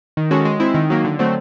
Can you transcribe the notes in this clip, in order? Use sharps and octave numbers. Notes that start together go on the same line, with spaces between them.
D#3
G#3 C#4 F#4 A4
G#3
C4 E4
D#3
F#3 A#3
D3
F#3 A3 C4